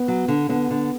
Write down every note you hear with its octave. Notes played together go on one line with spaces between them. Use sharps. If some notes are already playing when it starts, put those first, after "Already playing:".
Already playing: B3
F#3
D3
D3 B3
D3